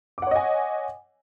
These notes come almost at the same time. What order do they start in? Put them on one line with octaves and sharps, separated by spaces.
D6 F#5 C#5 D#5 G#5